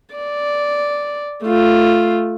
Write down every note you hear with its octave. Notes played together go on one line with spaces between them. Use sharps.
D5
A3 F4